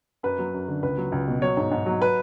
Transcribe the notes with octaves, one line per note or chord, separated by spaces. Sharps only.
F#2 B4
F#3
F#2
D3
C#2 B4
F#3
C#2
B2
F#3 C#5
G#2
G#2
F#3
B4